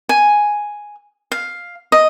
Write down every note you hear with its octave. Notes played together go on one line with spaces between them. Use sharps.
G#5
F5
D#5